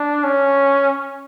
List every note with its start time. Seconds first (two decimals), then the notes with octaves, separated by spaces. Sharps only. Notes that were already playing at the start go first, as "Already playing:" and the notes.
Already playing: D4
0.24 C#4